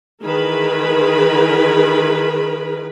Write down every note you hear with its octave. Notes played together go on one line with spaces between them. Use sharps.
D#3 E3 G#4 A#4 B4 B5